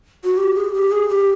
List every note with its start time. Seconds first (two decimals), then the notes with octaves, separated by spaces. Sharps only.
0.24 F#4
0.37 G4
0.54 G#4
0.73 G4
0.91 G#4
1.09 G4